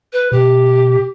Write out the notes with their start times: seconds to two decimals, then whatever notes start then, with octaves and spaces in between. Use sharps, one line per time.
0.13 B4
0.32 B2 G4